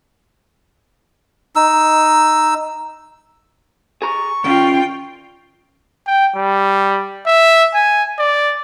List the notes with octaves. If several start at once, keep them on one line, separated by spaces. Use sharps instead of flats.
D#4 E6
G#4 A#5 C#6
D#3 C#4 F4 G5
G5
G3
E5
G#5
D5